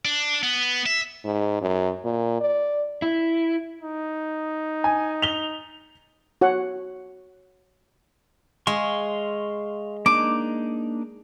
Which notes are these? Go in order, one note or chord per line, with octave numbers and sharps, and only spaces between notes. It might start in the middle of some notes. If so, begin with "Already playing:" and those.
D4
B3
E5
G#2
F#2
A#2
D5
E4
D#4
G#5
F7 G7
F#4 C#5 F#5
G#3 F5 C6 C#6
A#3 D4 D#4 D6